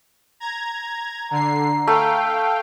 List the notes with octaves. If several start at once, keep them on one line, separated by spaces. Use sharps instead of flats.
A#5 G#6
D3 A#5 C7
A3 F5 G5